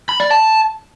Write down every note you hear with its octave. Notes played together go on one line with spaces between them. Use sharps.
B5
D5
A5